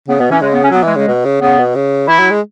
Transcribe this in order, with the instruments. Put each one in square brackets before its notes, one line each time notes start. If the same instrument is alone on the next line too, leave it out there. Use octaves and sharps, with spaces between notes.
[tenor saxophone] C#3 [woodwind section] B3
[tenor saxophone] B2 [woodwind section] B3
[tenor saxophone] E3 [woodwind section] C#4
[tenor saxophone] C#3 [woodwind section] G#3
[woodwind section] B3
C#4
[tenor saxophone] F#3 [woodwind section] B3
[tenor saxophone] E3 [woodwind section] G#3
[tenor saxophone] C#3 [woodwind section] G#3
[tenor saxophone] B2
C#3
[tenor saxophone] C#3 [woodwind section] B3
[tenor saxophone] B2
C#3
[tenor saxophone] E3 [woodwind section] E4
[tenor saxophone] F#3
G#3